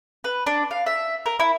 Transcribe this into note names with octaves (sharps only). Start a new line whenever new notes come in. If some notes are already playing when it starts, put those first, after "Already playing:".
B4
D4
F5
E5
A#4
E4